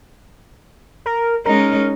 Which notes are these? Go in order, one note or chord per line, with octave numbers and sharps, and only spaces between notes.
A#4
G#3 C#4 D#4 A#4